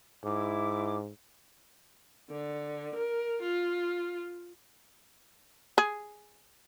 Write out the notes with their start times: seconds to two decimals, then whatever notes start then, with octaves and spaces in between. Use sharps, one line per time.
0.24 G#2 E4 D6
2.31 D3
2.95 A#4
3.42 F4
5.78 G#4